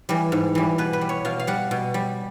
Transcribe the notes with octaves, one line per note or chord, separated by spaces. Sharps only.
E3 G3
G#2
E3 G3
B2 B4
B4
G3
C#5
B2 F5
F5
G3 F#5
B2
G3